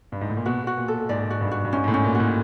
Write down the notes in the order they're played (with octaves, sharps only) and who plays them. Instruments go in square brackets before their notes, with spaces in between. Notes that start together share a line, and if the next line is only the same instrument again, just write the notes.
[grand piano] G2
G#2
A2
A#2
[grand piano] B2 [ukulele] F#4
[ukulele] F#4
[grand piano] A#2
[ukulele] A4
[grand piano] G#2 [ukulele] D5
[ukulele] F#4
[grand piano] G2
[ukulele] F#4
[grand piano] G2
[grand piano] G#2 [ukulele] C#4
[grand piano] G#2
A2
[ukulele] C#4
[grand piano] A#2
[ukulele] F#4
[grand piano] A2